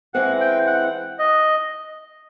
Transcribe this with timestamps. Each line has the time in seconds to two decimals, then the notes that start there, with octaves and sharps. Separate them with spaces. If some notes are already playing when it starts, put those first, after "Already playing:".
0.14 E3 G#3 C4 F#5
0.41 G5
0.67 F#5
1.19 D#5